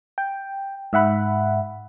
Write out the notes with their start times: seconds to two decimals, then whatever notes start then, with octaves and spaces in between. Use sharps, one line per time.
0.18 G5
0.93 G#2 E5 F#5 B5